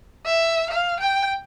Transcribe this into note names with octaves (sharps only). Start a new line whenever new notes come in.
E5
F5
G5